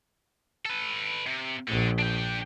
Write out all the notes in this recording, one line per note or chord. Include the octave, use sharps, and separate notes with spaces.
A4 B4
C3
A#1 D3
D4 G5